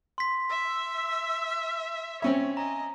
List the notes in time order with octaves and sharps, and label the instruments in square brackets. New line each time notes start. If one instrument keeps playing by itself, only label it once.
[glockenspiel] C6 B6
[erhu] E5 [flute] E6
[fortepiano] C4 C#4 E5 [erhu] C#5
[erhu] D#5 [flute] G#5 [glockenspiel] A#5